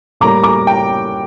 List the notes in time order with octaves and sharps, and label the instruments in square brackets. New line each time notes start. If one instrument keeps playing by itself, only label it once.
[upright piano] A2 G3 A#3 A#5 D6
A#5 D6
G5 A#5